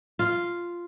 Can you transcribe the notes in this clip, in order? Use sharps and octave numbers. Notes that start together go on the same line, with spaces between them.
F4